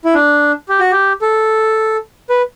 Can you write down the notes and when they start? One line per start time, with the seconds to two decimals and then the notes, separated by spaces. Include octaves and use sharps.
0.05 E4
0.14 D4
0.69 G4
0.80 F#4
0.91 G4
1.22 A4
2.30 B4